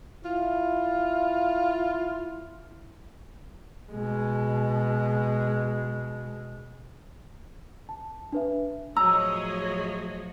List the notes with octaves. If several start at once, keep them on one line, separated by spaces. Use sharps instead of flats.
E4 F4
B2 G#3
A5
D4 B4 E5
A2 F3 F#3 G#4 C#5 D#5 A#5 E6